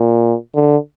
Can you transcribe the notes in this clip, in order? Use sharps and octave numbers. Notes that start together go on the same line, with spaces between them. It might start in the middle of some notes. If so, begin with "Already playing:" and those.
Already playing: A#2
D3